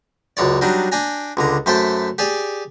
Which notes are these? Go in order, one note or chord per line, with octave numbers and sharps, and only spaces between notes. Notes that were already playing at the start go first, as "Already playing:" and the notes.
C#2 F#2 C#5 D5
F#3 G3 D4 D#4
D4 G5 G#5 A#5
C#2 D3 A#5
F#2 A3 C5 E5 G5 A5
G4 G#4 D5 G#5